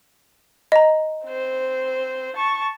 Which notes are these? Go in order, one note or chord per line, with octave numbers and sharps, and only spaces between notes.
D#5 A#5
C4 C5
A5 C#6